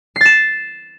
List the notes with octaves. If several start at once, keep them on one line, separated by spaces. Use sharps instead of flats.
A6 C7 E7